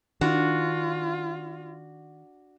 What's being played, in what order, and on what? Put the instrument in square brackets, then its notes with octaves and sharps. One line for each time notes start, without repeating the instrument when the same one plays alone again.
[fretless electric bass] D#3 [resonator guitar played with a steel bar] D4 F#4 [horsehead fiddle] F4